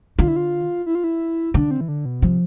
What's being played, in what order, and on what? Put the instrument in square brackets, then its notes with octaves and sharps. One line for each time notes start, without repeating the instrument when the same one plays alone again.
[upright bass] D3 [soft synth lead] F4
[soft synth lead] E4
F4
E4
F4
E4
[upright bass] D3 [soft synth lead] D4
[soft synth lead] C4
E3
D3
B2
[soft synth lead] C3 [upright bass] F3